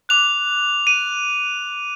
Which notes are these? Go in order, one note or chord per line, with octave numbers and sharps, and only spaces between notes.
D6 F#6 F7
D#7